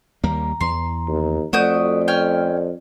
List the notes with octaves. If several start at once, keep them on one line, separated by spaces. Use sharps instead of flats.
D#2 G3 A#3 A#5
E2 C6
D#2
F2 A3 F#4 D5 D#6 G6
C#4 G5 F6